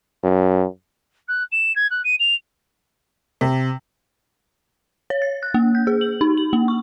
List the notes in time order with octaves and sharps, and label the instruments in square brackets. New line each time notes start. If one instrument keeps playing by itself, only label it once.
[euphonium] F#2
[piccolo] F#6
E7
G#6
F#6
D#7
F7
[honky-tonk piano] C3
[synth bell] C#5
A6
F#6
A#3
G6
G#4
F#7
D#4
F#7
A#3
C#6